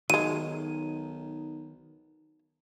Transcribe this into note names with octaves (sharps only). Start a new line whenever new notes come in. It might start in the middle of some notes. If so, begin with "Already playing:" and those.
B1 D#3 F#3 G#3 D#7